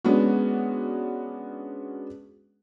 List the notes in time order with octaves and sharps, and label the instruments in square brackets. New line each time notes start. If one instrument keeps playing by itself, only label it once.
[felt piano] G#3 B3 C#4 D4 F#4